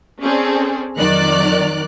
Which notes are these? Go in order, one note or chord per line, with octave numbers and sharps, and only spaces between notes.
C4 C#4 G#4 A4 D5
F2 D#3 F#3 A#4 D5 F#6